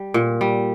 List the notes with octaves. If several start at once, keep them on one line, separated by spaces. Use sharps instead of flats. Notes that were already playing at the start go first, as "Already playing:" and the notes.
Already playing: G3
A#2
G3